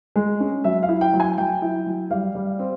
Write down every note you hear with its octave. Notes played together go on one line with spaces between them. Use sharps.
G#3
C#4
F#3 E5
F5
E4
G5
F#3
G#5
F#3 G5
E4
F#3
G3 F5
G3
C4